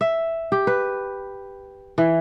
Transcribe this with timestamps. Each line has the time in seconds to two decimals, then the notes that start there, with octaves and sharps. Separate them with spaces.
0.01 E5
0.52 G4
0.67 B4
1.98 E3